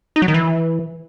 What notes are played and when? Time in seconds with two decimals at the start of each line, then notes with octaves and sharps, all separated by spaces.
0.16 D#4
0.22 F#3
0.28 D#3
0.34 E3